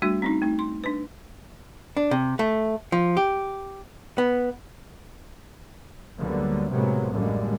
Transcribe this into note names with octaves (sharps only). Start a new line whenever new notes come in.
G3 A3 D4 F#4
C4 C#4 D#4
A3 D#4
C6
D4 B4
D4
C3
A3
F3
G4
B3
D2 D3 F#3 G3 A#3 B3
A2 C3 F#3 G#3 A#3 B3
A1 F#2 D3 G3 G#3 A#3